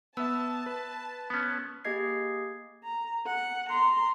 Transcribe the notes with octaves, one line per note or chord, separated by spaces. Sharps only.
B3 E5 A5 E6
B4
B3 C#4
A#3 G4 G#4 D#5 G#6 C7
A#5
F#5
A#5 C6